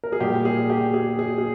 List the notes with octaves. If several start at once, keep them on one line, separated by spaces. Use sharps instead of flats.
A#4
G#4
A#2 G3 A#3 G4
G#4
G4
G#4
G#4
G#4